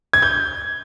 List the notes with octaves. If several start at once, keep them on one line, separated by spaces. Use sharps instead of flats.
G#6
G6